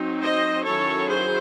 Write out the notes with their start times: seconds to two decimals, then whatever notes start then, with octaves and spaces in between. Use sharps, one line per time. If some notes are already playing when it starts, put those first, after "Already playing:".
Already playing: F#3 C4 D#4
0.23 C5 D#5
0.65 D#3 F#3 C#4 E4 A4 C#5
1.09 G#4 C5